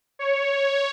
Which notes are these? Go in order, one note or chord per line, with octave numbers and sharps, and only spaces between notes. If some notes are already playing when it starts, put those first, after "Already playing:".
C#5